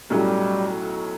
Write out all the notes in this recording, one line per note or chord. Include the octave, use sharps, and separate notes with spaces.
B1 A2 F#3 G3 C#4 E4